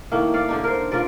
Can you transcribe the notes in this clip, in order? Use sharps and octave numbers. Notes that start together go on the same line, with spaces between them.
A2 D#3 A3 A#3
D5 F5 F#5
D3 D4 D#4
A#4 C5
F4 A#4 B4 D5